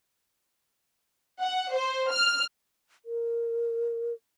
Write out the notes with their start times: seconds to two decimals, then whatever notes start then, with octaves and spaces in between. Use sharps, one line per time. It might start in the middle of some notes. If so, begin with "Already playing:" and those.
1.41 F#5
1.73 C5
2.11 F6
3.05 A#4